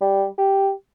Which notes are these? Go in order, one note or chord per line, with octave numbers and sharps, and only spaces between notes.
G3
G4